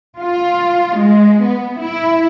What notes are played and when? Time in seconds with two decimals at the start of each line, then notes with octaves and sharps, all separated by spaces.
0.18 F4
0.96 G#3
1.42 B3
1.81 E4